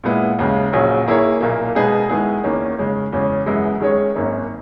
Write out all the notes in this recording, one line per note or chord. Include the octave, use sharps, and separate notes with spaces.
A#2 G#3 B3 E4
D#2 C#3 G#3
A#1 A#2 F#3 C#4 G#4
D#3 A#3 E4 G#4 C#5
B1 A#2 A#3
B2 G#3 D#4 G#4 B4
D#3 G#3 B3 E4 G#4
E2 D#3 A#3 C#4
C#3 G#3 C#4
E2 C#3 G#3 C#4
F#2 E3 G#3 B3 E4
D#3 G#3 C#4 G#4 C#5
G#1 F#2 D#3 A#3 C#4